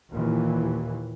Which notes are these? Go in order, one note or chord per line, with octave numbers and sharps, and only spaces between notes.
D#2 A#2 E3